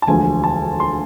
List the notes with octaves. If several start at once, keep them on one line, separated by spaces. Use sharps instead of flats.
A5
E1 D2 D3 F3 G#5
A5
C6